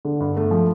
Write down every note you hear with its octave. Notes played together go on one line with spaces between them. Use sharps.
D3
G2
A3
F3